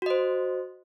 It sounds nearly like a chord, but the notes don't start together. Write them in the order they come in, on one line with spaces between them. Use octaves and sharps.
F#4 D#5 C5